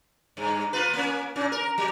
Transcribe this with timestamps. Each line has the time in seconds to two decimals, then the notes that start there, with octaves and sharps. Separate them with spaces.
0.37 G2
0.73 A#3 F4 B4
0.94 A#3 C#4
1.36 A#2 C#4
1.52 A#4
1.78 F#3